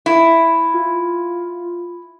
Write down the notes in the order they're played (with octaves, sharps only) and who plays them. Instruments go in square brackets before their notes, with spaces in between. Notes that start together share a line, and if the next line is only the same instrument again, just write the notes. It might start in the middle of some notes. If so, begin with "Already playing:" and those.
[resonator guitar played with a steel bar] E4
[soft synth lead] F4